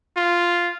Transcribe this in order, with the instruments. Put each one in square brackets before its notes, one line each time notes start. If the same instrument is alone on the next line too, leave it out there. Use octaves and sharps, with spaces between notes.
[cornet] F4